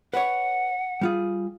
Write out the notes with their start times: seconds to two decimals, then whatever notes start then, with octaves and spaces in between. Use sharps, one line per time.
0.14 B4 C#5 F#5
1.01 G3 F4 G#4